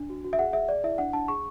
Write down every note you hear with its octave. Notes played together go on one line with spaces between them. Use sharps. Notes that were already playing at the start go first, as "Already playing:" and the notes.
Already playing: D4
F#4
F#4
E5
G#4 F#5
G#4 E5
D5
E4 E5
D4 F#5
D4 A5
G#4 C#6